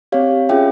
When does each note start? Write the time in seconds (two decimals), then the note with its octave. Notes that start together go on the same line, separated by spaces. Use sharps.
0.12 C4 G4 C#5 F5
0.49 C#4 F4 G#4 E5 G5